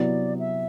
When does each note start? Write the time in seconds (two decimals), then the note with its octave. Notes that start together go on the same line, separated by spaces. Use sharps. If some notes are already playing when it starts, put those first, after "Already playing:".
Already playing: C3 F#3 B3 E4 D5
0.39 E5